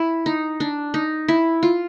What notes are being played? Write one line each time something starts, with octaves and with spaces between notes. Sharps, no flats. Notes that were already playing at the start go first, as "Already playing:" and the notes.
Already playing: E4
D#4
D4
D#4
E4
F4